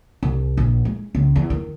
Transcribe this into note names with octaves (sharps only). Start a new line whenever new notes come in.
C2
A#1
G#3
C#2
E2
D#3